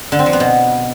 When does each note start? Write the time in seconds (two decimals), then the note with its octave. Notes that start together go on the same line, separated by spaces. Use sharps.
0.12 D3
0.19 C4
0.26 F3
0.33 B3
0.40 B2